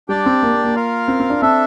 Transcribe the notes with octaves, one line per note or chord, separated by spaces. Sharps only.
G3 D4 G4 D5 G5
C4
A#3
A#3
A#3
F4 A#4 F5
C4
C4
D4
C4 D4 A4 E5